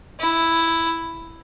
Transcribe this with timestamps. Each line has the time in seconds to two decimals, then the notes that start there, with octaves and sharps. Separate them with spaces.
0.21 E4